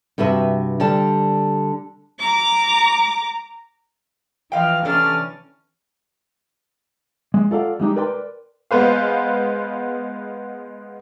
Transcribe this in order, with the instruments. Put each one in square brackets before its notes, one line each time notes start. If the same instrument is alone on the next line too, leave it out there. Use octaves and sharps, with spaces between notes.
[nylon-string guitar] G2 C3 F#4 B4 E5
D3 G3 A5
[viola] A#5 D6
[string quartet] E3 F3 F6 [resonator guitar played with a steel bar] D#5 F5 G5
[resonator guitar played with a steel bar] C3 D4 A4 [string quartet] E3 C#4 A6 [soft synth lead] F6
[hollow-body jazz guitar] G#3
F4 A4 D5 F5 F#5
G3 G#3 D#4 G4
A#4 B4 D5 G5 B5 C6
[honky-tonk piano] G#3 B3 B4 C5 F5